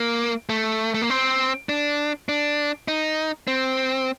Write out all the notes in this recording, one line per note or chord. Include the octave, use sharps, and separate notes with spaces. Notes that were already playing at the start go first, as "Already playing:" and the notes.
Already playing: A#3
A3
A3
A#3
C4
D4
D4
D#4
C4